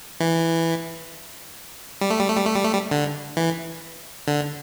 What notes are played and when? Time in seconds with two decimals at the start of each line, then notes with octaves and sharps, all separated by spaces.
0.20 E3
2.01 G3
2.10 A3
2.20 G3
2.29 A3
2.37 G3
2.46 A3
2.56 G3
2.64 A3
2.73 G3
2.91 D3
3.37 E3
4.28 D3